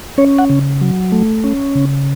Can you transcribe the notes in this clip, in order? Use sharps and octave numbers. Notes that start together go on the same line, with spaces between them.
C#4 C#5
F#5
C#3
F#3
A3
C#4
C#3